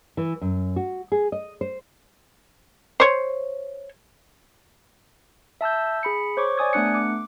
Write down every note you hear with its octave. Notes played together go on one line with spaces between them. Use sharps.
E3
F#2
F#4
G#4
D#5
C5
C5 C#5
E5 A5 E6 G6
G#4 B5 C#7
C5 C#5 C#6 D6
D5 G#5 D#6 G#6
A3 B3 D4 F#6 C#7
D6